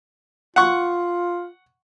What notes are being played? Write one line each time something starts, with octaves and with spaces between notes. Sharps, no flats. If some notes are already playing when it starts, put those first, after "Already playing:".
F4 F#5 C#6